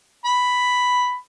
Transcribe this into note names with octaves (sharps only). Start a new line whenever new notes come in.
B5